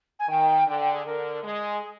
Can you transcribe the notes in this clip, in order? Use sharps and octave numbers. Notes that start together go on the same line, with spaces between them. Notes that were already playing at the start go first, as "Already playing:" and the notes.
G#5
D#3 G5
D3 G5
G5
G#4
D3 A#4
G#3 G#4
G#4